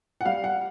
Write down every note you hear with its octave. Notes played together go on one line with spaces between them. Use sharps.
F#5
G3 F5
F#5